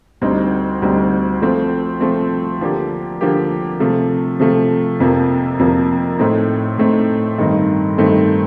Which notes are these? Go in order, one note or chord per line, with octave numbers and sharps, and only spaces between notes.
D2 D3 G3 C4 D#4
D2 D3 G3 C4 D#4
F3 A3 C4
F3 A3 C4
D3 F3 A#3 D4 G4
D3 F3 A#3 D4 G4
C3 F3 A3
C3 F3 A3
F2 C3 F3 A#3
F2 C3 F3 A#3
A2 A3 C4 D#4
A2 A3 C4 D#4
G2 D#3 A3 C4 D#4
G2 D#3 A3 C4 D#4